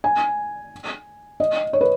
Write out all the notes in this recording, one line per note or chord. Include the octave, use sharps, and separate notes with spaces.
G#5
D#5
C#5
B4